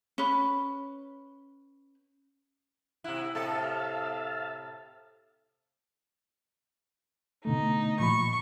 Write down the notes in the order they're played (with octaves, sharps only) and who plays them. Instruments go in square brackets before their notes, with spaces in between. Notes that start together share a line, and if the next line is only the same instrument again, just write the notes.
[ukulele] C#4 B4
[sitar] C3 E4 [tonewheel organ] F#5
[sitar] A2 C3 A4 [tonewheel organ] E5 F5 A5
[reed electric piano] B2 D3 A3 [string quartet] D#4
[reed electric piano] A#2 F3 B5 [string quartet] C#6